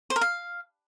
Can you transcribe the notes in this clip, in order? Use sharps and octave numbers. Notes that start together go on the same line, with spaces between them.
C5
A#4
F5